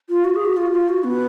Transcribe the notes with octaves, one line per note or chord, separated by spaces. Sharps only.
F4
F#4
G#4
F#4
F4
F4
F#4
B3